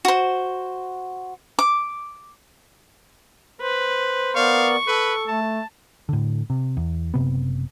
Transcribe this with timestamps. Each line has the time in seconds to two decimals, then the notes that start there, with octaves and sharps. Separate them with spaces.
0.05 F#4 C5
1.59 D6
3.61 B4 C5
4.36 B3 A#4 D5 F5 C#6
4.88 A4 B4
5.28 A3 A5
6.09 A2 D3
6.50 C3
6.77 E2
7.14 F#1 C3 B3